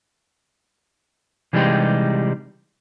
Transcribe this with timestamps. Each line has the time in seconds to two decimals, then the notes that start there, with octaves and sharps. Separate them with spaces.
1.53 C3 E3 G3 G#3 D#4 G4